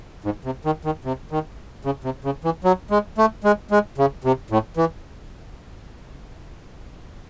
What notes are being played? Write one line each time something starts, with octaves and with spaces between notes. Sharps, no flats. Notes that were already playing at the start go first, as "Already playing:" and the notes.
G#2
C3
D#3
D#3
C3
D#3
C#3
C3
C#3
E3
F#3
G#3
A3
G#3
G#3
C#3
C3
A2
E3